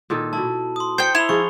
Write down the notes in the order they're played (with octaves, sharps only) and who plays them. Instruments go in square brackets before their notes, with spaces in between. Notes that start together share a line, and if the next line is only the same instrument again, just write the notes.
[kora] A#2 D#3 A4
[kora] B2 E4 [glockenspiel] A5
[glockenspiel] C6 D#6
[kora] C5 [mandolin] G5 G6 [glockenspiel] C7 C#7
[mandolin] E4 [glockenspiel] B5 F7 G7
[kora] F3 D#4 G#4 [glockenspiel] C#6